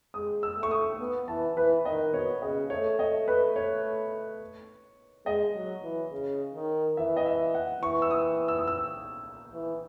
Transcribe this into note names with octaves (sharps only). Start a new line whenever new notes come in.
G#3 D#6
E6
A3
C#6
D#6
B3
E3 A5
E3 B4
D#3 D#5
B2 C#5
C#3 D#5
A3 C#5
D#5
B4
C#5
G#3 D#5
F#3
E3
C#3
D#3
E3 E5
D#5
E5
F#5
E3 C#6
E6
D#6
E6
D#6
E6
E3